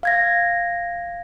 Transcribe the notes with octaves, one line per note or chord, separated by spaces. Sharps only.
F5 G#6 A#6